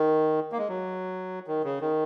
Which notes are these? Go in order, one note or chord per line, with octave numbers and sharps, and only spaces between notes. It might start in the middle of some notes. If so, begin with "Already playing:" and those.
Already playing: D#3
A#3
G#3
F#3
D#3
C#3
D#3